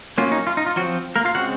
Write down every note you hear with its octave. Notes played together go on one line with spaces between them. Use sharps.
F#3 A#3 C#4 F4
D#4
F4
D#4
F4
F3 F#3 C4 F#4
A#3 A#4
F4 F5
C#3 G#3 C4 F#4 F#5